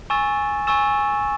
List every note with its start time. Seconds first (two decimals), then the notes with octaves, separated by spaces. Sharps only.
0.10 G#5 C#6 E6 A6 E7
0.67 G#5 C#6 E6 A6 E7